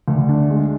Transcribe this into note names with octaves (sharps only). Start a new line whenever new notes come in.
D2
D4
G#3